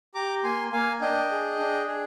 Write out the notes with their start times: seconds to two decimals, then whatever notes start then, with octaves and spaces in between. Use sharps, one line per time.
0.15 G4 A#5 D6
0.44 A#3 G#5 C6
0.72 A#3 F5 G#5
1.01 D4 D#5 G5
1.31 G#4
1.59 D4
1.88 G#4